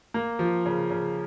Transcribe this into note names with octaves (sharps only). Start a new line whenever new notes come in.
A#3
F3
C#3
C#3